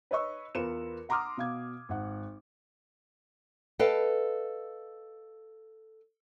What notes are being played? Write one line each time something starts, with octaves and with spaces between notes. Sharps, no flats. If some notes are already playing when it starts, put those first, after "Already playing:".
B4 C#5 D#5 C#6 E6
E2 F4 A#4 B4 C#7 E7
F#5 A#5 C6 D6 D#6 F6
B2 F5 G#6
G#1 F#5
A4 B4 D#5 F5 G5